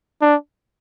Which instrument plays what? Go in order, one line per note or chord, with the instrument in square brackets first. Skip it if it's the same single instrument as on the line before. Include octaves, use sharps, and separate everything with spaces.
[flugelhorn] D4